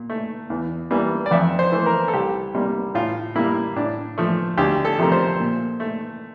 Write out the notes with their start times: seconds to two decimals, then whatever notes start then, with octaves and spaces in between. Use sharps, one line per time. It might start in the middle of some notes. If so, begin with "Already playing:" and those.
Already playing: A#2
0.10 A3
0.50 E2
0.91 E3 G3 A#3
1.26 D5
1.31 F2 E5
1.59 C5
1.72 E3 A3
1.86 A#4
2.08 A4
2.13 C2 G4
2.55 C3 G3 A#3
2.95 A2 F4
3.36 G3 A#3 E4
3.76 A2 D4
4.18 F3 A3
4.58 D2 G4
4.85 A4
4.98 C3 F3 A3 A#4
5.12 C5
5.40 A#2
5.80 A3